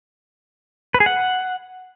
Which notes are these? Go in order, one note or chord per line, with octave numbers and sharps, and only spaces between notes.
B4
G#4
F#5